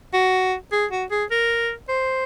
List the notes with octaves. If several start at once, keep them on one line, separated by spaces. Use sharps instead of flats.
F#4
G#4
F#4
G#4
A#4
C5